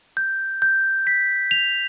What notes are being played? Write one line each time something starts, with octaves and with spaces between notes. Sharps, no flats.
G6
G6
B6
F7